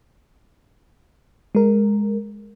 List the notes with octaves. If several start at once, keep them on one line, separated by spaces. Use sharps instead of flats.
G#3 A#4